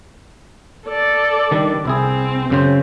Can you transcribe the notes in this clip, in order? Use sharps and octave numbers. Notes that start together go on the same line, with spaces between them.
A4 D5
D#3 G3 D4
C2 C4 E4 G#4
F#2 C#3 C5